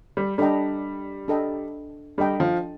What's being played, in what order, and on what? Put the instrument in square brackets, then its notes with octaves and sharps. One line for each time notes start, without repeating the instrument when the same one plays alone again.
[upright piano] G3
[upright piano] G3 [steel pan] D4 A4 D#5 G5 A#5
[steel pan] D4 A4 D#5 G5 A#5
[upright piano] G3 [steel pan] D4 A4 D#5 G5 A#5
[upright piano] F3